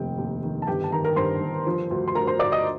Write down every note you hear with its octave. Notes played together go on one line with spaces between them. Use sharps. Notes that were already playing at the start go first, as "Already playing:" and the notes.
Already playing: F1 D#2 G4 G5
D#2
D#3
A5
G1 G4 G5
A5
D#3 A#4 A#5
A#4 A#5
G2 C5 C6
G1
F3
D2
C6
D2 A#4 A#5
C5 C6
D2 D5 D6
D#5 D#6